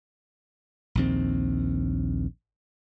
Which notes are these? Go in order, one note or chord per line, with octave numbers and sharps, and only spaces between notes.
A#1 D#2 C4